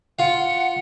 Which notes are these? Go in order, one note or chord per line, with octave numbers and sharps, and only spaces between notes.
F4 F5 F#5